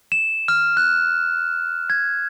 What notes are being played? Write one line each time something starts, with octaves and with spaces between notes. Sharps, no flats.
E7
F6
F#6
G#6